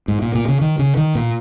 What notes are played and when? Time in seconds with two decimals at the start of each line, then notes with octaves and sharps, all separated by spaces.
0.08 G#2
0.22 A#2
0.35 A#2
0.48 C#3
0.61 D#3
0.79 C#3
0.97 D#3
1.15 A#2